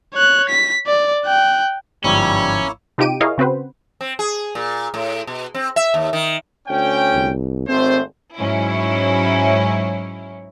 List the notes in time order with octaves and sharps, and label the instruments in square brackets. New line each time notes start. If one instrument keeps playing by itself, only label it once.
[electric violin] C#5 F#6
B6
D5
G5 F#6
[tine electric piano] G1 G#2 F3 [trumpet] G3 [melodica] A#3 E4 C#5 [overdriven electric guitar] C#4
[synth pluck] C3 D#4 F4 G4 D7 D#7
E4 G#4 A#4 C#5 D#5 F5
C#3 C4 F#4 B4 C5
[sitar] C4
G#4
A#2
A2
B2
C4
E5
D#2
D#3
[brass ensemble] D2 C#4 G5
[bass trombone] C2
[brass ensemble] G#1 A3 C5 [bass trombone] C4
[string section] G#2 F#3 C#4 E4